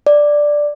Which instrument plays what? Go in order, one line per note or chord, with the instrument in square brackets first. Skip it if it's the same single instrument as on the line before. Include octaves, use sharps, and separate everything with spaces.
[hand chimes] D5